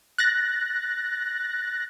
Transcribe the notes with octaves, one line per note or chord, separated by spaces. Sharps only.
F#6 A6 A#6